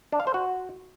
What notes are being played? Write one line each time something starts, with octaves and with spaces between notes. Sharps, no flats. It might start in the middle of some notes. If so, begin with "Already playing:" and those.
D4
F5
C5
F#4